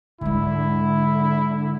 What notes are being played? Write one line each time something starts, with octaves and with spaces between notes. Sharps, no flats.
G#2 D3 G#3 E4